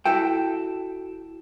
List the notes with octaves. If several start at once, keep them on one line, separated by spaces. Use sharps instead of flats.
E4 F#4 A4 G5